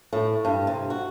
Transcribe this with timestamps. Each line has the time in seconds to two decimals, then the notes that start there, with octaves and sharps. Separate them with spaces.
0.13 A2
0.45 G2
0.67 C3
0.90 F#4